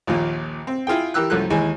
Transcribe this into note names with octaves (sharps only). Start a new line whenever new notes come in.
A#1 D#2 A#2
C4
E4 F4 G#4 G5
E3 G4 A#4 E6 F#6
C2 F#2 F3 A3 F#6
D#2 E3 G#3 G#5